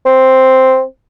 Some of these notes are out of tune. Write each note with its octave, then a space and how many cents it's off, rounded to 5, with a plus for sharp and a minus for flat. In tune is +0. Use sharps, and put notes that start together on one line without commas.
C4 +0